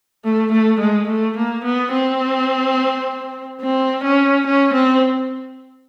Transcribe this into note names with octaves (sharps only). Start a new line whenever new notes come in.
A3
A3
G#3
A3
A#3
B3
C4
C4
C#4
C#4
C4